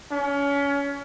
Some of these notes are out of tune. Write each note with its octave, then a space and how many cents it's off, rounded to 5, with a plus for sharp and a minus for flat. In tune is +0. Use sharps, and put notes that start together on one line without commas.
C#4 +30